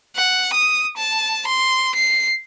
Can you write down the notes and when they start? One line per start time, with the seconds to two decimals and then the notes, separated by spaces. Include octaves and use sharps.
0.16 F#5
0.54 D#6
0.97 A5
1.47 C6
1.95 C7